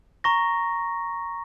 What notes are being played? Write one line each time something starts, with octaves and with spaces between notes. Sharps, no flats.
A#5 C#6 A#6